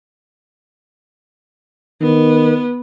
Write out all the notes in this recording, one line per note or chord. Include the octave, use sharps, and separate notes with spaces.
D#3 B3